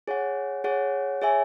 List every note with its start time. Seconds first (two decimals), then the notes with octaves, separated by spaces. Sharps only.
0.08 G#4 C#5 F#5
0.64 G#4 C#5 F#5
1.21 G#4 C#5 E5 G#5